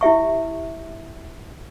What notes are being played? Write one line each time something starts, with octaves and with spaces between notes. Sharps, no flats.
E4 G4 E5 C#6